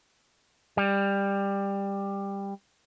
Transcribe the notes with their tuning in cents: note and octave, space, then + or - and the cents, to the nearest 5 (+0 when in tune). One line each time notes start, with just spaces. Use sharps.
G3 +15